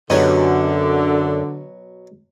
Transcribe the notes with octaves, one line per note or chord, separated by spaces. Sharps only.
F#2 B2 D3 F#3 F#4 G4 D#5